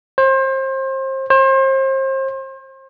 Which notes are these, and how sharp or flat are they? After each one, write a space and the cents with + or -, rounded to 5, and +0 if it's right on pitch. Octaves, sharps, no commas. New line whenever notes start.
C5 +30
C5 +35